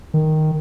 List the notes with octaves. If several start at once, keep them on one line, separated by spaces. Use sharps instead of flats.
D#3